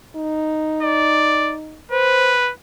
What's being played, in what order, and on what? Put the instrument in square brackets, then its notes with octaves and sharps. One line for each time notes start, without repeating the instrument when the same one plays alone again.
[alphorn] D#4
[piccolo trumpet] D5
[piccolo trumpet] B4 [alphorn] C5